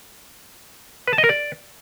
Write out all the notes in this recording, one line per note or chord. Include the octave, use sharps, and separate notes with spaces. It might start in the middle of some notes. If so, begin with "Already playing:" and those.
B4
A5
D#5
A#4
D5